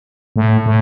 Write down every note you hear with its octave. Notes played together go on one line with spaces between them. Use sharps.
A2
A2